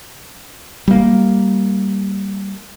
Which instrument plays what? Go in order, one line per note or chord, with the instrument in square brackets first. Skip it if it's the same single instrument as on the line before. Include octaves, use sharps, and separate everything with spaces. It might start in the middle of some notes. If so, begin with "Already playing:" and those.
[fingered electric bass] G3 A3 A#3